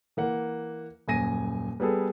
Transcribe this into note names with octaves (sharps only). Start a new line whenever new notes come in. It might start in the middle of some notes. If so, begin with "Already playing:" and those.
E3 A#3 F#5
D#1 F#2 G#5 A#6 D#7
G3 B3 G#4 A4